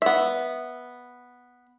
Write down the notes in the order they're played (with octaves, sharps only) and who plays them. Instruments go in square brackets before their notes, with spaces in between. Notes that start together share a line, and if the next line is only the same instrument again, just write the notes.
[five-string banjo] B3 E5